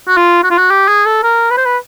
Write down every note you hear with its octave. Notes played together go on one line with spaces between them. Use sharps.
F#4
F4
F#4
F4
F#4
G4
G#4
A4
A#4
B4
C5
B4